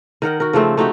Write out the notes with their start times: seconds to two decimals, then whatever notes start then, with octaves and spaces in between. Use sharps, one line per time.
0.22 D#3 A#4 F#5 G5
0.40 F#4 A#4
0.53 C#3 F3 A3 C4
0.77 A3 D#4 F#4 G4